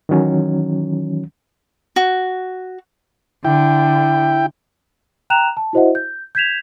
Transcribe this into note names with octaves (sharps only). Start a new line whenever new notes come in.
D#3 E3 F#3 C#4
F#4
D3 E4 G5
G5 A#5 F#6 E7 F7
A5
E4 F#4 C5 D#5 E5 F#5
G6
G6 G#6 B6 E7 F7